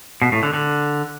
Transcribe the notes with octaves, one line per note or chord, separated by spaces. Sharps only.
B2
A2
D3
D3